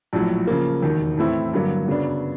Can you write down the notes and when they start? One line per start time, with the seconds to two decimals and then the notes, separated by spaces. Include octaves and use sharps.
0.13 A#1 A2 F#3
0.47 C#3 F3 A#3
0.82 E1 D#2 D#3
1.18 A2 E3 A3 C4 E4
1.53 G2 D3 F#3 A#3
1.88 F#2 C#3 F#3 B3 D4